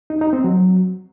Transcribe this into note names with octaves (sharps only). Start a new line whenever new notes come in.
D#4
D#4
C4
F#3